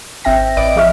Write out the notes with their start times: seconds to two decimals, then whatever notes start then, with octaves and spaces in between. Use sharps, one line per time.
0.24 G#1 C4 E5 G5 A#6
0.57 A1 B4 D5 D#5 D7
0.76 F3 G#4 E5 C#6 F6